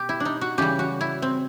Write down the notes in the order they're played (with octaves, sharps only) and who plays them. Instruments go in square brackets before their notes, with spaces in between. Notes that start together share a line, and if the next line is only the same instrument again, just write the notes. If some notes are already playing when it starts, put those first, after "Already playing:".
Already playing: [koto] B2 G4
E4
D4
D#4
F#4
C#3 E3 G3 G4
F#4
E4
C4